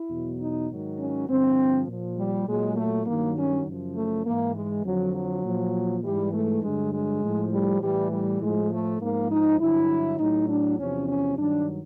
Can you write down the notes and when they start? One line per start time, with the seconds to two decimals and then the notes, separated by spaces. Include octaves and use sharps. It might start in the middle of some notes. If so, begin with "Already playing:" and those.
Already playing: E4
0.09 E2 B2 F#3
0.39 D#4
0.70 G#2 D#3 F#3
0.99 C#4
1.28 G2 D3 F3 C4
1.88 A#2 F3
2.17 G3
2.47 A#2 F#3 G#3
2.77 A3
3.06 G2 D#3 F#3 A#3
3.36 C#4
3.66 F#2 C#3 F3
3.96 A3
4.26 G#2 E3 A#3
4.55 G#3
4.84 F2 D3 F3 F#3
5.15 F#3
5.44 A#2 F3
6.04 G#2 E3 G3
6.33 A3
6.62 G2 D3 F#3 G#3
6.93 G#3
7.22 A2 F3
7.52 G3
7.82 A2 E3 G3
8.11 G3
8.41 A2 F3 G#3
8.71 A3
9.01 G#2 F3 A#3
9.30 D#4
9.60 G2 D3 F#3 E4
10.19 A2 F#3 D#4
10.49 D4
10.78 E2 C3 F3 C#4
11.08 C#4
11.38 G2 D#3 F#3 D4